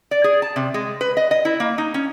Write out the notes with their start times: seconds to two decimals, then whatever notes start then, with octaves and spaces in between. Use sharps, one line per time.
0.11 D5
0.24 G#4
0.42 A5
0.56 C3
0.74 G#3
1.01 B4
1.17 D#5
1.31 D#5
1.45 E4
1.60 A#3
1.78 D#4
1.94 C#4